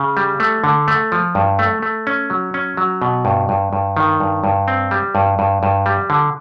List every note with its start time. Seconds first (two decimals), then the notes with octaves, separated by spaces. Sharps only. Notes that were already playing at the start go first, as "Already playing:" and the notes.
Already playing: C#3
0.17 G3
0.40 A3
0.64 D3
0.88 A3
1.12 F3
1.35 G2
1.59 A3
1.82 A3
2.07 C#4
2.30 F#3
2.54 C#4
2.77 F#3
3.02 B2
3.25 G2
3.49 G2
3.73 G2
3.97 D#3
4.20 G2
4.44 G2
4.68 C4
4.91 G3
5.15 G2
5.39 G2
5.63 G2
5.86 G3
6.10 D3